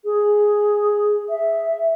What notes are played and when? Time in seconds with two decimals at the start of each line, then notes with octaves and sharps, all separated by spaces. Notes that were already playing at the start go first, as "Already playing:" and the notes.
0.04 G#4
1.29 E5